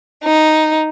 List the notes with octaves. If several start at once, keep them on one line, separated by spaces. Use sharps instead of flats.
D#4